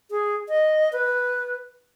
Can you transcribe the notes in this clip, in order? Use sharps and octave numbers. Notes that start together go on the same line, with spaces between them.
G#4
D#5
B4